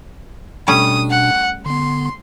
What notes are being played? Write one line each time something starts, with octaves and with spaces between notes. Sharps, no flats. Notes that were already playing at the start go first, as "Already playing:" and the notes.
B2 G3 A3 C#4 D4 D#6
F#5
D3 B3 C6